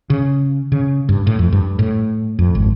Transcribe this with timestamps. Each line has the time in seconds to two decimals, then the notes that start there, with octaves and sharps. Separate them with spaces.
0.10 C#3
0.72 C#3
1.09 G2
1.27 A2
1.39 F2
1.53 G2
1.79 A2
2.39 F2
2.55 G#1